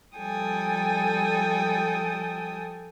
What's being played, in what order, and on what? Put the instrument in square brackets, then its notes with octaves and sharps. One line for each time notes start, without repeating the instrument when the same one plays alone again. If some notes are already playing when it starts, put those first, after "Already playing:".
[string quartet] F3 G3 A4 G5 G#5 D#6